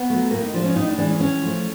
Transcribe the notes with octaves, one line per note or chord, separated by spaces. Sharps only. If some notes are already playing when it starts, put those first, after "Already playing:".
Already playing: B3
F#3 A3
A2 A#3
D#4
F3 G#3 D4
C#4
A2 D#4
D4
E3 G#3 D4
C#4
A2 C#4
F3 A3